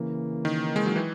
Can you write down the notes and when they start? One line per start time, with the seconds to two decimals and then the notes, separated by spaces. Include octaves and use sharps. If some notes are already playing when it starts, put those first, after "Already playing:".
Already playing: C#3 E3 A#3
0.45 D#3
0.76 G#3
0.86 F#3
0.96 E3